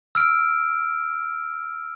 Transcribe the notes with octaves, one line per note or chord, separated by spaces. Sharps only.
E6 F6 D7